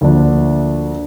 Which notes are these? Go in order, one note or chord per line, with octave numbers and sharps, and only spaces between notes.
D2 D3 F3 A#3 D4